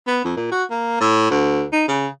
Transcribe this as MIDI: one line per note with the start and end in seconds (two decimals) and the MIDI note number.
0.07 0.22 59
0.25 0.33 41
0.37 0.48 46
0.51 0.63 66
0.71 0.99 58
1.00 1.29 45
1.30 1.64 38
1.72 1.85 63
1.88 2.07 49